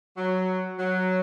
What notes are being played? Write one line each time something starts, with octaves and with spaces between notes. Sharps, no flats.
F#3
F#3